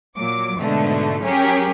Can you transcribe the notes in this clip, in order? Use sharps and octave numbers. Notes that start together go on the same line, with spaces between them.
A#2 F#3 D6
G#2 B2 D3 A3
F#3 C#4 G4 G#4 A#4